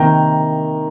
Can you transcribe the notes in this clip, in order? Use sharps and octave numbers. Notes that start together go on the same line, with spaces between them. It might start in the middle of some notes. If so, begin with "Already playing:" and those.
Already playing: C3 D#3 A#3 G5 A#5